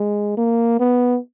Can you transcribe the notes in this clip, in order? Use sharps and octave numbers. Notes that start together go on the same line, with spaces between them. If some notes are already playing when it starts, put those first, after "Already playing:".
Already playing: G#3
A#3
B3